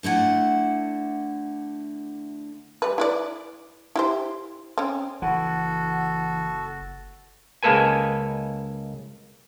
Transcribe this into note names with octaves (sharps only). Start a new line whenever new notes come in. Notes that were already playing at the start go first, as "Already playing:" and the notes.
D3 A3 E4 F#5
G3 B4
E4 B4 D5
E4 G4 C5
C4 C#4
F#1 E3 F#4 A4 F#5
C#2 G#3 A#3 A4 B4 G#5